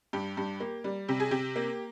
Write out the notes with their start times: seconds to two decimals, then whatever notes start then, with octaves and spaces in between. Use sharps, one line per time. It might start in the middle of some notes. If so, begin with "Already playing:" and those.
0.13 G2 G4
0.37 G2
0.60 A#3
0.84 G3
1.08 C3 G4
1.20 G#4
1.31 C3 G4
1.56 A#3